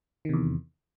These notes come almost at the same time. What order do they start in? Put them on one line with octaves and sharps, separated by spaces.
D#3 C3 E2